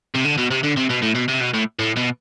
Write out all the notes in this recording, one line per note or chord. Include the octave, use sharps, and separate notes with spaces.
C3
D3
B2
C3
D3
C3
B2
A2
B2
C3
B2
A2
A2
B2